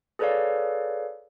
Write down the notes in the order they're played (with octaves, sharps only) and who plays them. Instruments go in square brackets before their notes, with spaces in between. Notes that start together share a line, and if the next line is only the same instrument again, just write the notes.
[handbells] G#4 A4 B4 C#5 D5 F5